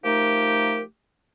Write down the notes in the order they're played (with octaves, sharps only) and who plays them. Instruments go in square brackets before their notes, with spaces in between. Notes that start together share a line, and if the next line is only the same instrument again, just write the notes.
[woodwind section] F3 A3 D#4 G4 A#4